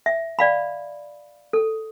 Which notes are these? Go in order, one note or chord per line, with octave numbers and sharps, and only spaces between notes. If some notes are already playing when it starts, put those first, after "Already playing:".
E5
D5 F5 B5
A4